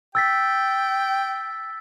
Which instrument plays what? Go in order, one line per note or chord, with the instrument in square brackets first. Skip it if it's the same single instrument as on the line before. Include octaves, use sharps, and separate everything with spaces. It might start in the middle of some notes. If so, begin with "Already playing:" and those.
[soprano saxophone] G5 [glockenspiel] E6 A6 B6